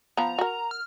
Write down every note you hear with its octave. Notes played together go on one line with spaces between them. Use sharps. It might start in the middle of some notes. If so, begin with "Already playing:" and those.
F3 B3 A#5
F#4 A#4
F6